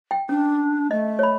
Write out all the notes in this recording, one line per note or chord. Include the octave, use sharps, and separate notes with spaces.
G5
C#4 D4
A3 D#5
C#5 B5